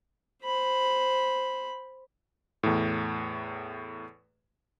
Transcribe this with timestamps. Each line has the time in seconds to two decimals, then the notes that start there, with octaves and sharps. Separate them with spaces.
0.43 C5 B5
2.63 E2 A2